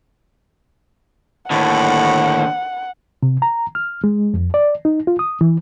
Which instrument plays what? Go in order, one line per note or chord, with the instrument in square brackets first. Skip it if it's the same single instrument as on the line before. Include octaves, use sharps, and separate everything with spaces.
[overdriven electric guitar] D#2 D3 [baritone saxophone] A2 [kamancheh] F#5
[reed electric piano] C3
A#5
F6
G#3
F2
D5
D#4
F4
D#6
E3